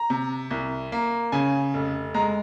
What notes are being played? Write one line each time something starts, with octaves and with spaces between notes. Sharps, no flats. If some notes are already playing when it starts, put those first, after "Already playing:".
Already playing: A#5
C3
C2
A#3
C#3 G#5
F1
G#3 A#5